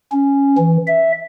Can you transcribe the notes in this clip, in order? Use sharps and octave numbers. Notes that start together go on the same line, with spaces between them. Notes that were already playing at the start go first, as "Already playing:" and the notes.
C#4
E3
E5